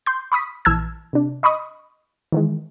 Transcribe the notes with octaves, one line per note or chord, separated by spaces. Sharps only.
C6 G6
B5 C#6 D#6 B6
A#1 E3 A5 E6 F6 G#6
C3 D4
D#5 B5 C#6 D#6
D#3 E3 G#3